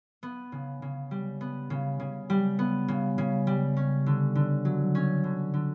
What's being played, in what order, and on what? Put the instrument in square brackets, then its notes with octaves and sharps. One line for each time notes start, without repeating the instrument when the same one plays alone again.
[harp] B3
C#3
C#3
G3
B3
C#3
C#3
G3
B3
C#3
C#3
G3
C#4
D3
D3
F#3
C#4
D3
D3